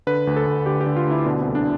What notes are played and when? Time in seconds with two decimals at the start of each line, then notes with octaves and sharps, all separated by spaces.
0.07 D3 B4
0.27 D2
0.36 A4
0.47 D2
0.66 D3 G4
0.81 G4
0.86 D3
0.96 F4
1.07 D2 E4
1.26 B2 D4
1.41 C4
1.46 C2
1.55 D4